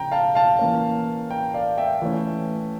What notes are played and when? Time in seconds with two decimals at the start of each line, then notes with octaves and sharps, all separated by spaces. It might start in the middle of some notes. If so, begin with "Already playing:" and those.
Already playing: C#3 F3 C#4 G5 A#5
0.12 F5 A5
0.35 F5 A5
0.59 E3 A#3 C#4
1.30 G5 A#5
1.54 D5 F5
1.78 E5 G5
2.02 E3 A3 C#4